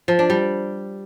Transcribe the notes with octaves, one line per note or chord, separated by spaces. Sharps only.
F3
D4
G3